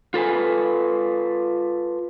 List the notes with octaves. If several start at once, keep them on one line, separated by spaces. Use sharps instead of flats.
F4 A4 B4 G#5